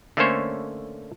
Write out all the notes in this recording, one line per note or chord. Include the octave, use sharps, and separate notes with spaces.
D3 A3 A#3 C#4 C5 C#5